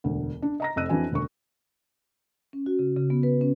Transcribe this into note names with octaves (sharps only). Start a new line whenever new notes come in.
E1 D2
D4
D#5 A#5 A#6
F1 F2 D#5 E6 F#6 D#7
F2 E3 D4 F#4 G#5
E1 D2 C#6
C#4
F#4
C#3
C#3
B3
B4
C#4